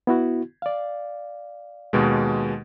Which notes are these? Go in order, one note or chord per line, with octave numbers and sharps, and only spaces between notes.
B3 E4 F#4
D5 F5
D#2 B2 G#3